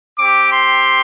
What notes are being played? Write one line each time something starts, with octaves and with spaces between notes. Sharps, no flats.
C4 G4 D6
C6